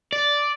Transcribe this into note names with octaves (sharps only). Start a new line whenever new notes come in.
D5